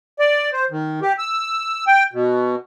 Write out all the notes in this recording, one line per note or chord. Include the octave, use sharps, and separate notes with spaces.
D5
C5
D#3
G4
E6
G5
B2